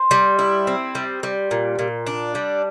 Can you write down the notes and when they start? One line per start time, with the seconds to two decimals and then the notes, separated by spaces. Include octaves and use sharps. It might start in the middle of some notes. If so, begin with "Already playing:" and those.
Already playing: C5
0.11 G3
0.39 E4
0.67 C4
0.95 G3
1.23 G3
1.51 A#2
1.79 A#2
2.07 D4
2.35 G3